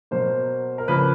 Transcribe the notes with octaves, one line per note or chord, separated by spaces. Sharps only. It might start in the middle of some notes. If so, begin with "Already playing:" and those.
B2 F#3 A#3 C5
A#4
C#3 F3 A#3 B4